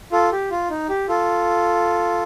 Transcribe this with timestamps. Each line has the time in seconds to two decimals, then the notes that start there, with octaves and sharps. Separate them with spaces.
0.12 F4 A4
0.32 G4
0.51 F4
0.70 D#4
0.89 G4
1.09 F4 A4